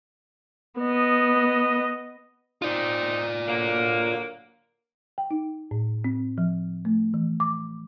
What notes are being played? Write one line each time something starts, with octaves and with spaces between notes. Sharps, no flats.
B3 D#5
C4 D#4 F4 D5
D3 F#3 A#3
G5
D#4
A2
C4
F3
A3
E3
D6